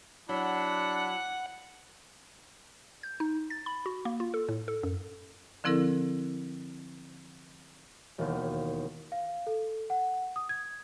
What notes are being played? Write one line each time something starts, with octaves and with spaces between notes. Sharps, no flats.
F#3 D4 E4 F#5
G6
D#4
A6
B5
F#4
A#3
F4
A4
A2
A4
F#2
D3 F3 C4 E4 A4 A#4
E1 D#2
F5
A4
F#5
D#6
G#6